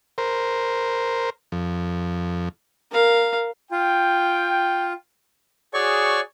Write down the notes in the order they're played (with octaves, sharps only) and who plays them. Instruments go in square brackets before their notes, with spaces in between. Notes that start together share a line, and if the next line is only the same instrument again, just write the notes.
[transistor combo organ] A#4 C5
F2
[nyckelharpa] A#4 F5
[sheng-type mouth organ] F4 [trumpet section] G5
[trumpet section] F#4 G#4 [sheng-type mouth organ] C#5 D5 C#6